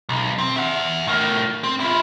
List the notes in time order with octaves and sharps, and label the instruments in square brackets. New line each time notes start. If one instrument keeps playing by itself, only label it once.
[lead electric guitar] B1
C4
E5 F#5
A2 A#4
C4
E4 F4